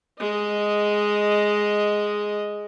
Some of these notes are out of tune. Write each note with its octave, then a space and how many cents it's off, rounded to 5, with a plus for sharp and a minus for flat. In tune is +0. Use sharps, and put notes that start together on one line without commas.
G#3 +0 D#5 +0